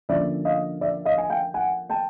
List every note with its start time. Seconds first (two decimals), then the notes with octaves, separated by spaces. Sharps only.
0.09 D3 F3 A#3 C#4 D5 E5
0.45 D#5 F5
0.81 D5 E5
1.05 D#5 F5
1.18 G#5
1.29 F5 G5
1.54 F#5 G#5
1.90 G5 A5